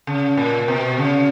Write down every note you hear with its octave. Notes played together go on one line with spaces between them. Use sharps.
C#3
A#2
B2
C#3